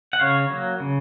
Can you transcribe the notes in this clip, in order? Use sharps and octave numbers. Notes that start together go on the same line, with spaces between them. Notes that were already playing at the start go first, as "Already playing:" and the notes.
F#5
C#3 C#5 F5
F#3 A#3
C#3